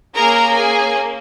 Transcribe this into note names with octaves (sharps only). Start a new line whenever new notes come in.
A#3 C#4 G#4 A#4 A#5
G#4 G#5